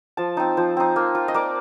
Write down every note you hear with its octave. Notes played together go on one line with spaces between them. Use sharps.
F3 A5
C4 D#4
F3 C5
C4 D#4
A#3
F4
D#5
A#3 D5